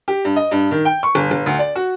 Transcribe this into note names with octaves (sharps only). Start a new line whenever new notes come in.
G4
G2
D#5
G2
D#3
G5
C#6
G1
G1
D2
D5
F#4